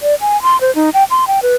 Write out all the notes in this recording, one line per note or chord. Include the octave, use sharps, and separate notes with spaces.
D5
G#5
C6
C5
D#4
G5
C6
G5
B4